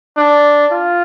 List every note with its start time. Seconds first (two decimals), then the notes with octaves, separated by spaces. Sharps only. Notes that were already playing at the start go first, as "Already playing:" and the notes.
0.17 D4
0.72 F4